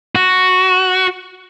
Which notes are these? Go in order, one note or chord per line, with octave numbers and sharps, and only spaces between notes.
F#4